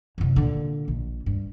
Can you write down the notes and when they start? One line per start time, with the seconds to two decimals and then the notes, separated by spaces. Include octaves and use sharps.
0.18 C2 F#2
0.36 A#2 D3
0.88 A#1
1.26 G2